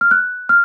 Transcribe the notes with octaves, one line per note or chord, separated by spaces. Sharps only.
F6
F#6
F6